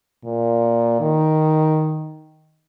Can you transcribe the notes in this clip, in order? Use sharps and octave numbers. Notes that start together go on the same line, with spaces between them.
A#2
D#3